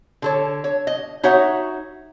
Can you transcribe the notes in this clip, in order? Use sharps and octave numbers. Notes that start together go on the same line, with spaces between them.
D3 A4 C#5
C#5
D#5
D#4 F#4 C#5 E5 F#5